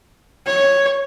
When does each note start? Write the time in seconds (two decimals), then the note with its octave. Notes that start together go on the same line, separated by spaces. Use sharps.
0.46 C#5